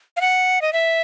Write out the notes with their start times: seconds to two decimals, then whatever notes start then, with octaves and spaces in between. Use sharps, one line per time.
0.17 F5
0.21 F#5
0.62 D#5
0.73 E5